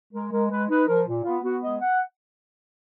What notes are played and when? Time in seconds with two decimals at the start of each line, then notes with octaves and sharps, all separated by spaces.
0.13 G#3 A#4
0.31 G#3 A#4
0.50 G#3 B4
0.69 D#4 B4
0.88 F3 A#4
1.07 A#2
1.24 B3 F4
1.43 B3 F#4
1.63 G#3 D#5
1.80 F#5